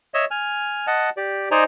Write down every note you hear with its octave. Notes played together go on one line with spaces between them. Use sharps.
C#5 D#5 E5
G#5 F6
D#5 F#5 A5
G4 D5
D#4 C5 D5 D#5 G#5 A#5